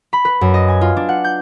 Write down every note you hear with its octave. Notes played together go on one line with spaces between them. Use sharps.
B5
B4
F#2
D#5
G#5
F4
D4
F#5
G6